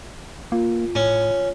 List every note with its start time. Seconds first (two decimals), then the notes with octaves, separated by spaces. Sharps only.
0.52 A#3 F4
0.95 A2 C#4